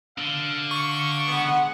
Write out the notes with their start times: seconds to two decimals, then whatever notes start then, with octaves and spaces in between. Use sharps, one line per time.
0.18 D3 F5
0.71 C#6
1.27 G#3 B3 F#5